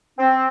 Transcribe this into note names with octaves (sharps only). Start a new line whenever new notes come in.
C4